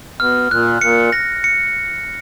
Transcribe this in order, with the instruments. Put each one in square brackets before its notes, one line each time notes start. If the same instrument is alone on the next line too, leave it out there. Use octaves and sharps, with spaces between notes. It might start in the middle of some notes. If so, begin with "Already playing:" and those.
[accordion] B2 [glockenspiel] F6
[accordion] A#2 [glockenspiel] F#6
[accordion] A#2 [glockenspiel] C#7
[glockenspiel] A#6
C#7